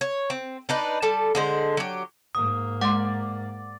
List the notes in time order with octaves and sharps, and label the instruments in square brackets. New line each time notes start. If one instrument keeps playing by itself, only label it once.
[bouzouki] C#5
C4
D4 D#4 B4
G3 A4 A5
D3 G#3 C5
F#3 G4
[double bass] G#2 A#3 [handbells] D#6
[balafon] G#3 C6 [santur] D5 [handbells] F#5